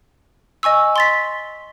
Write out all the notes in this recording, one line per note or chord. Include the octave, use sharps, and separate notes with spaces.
D#5 G#5 C#6 E6
C6 A6 B6